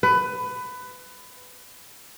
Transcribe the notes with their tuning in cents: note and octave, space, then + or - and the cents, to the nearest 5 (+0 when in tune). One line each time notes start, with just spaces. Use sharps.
B4 +20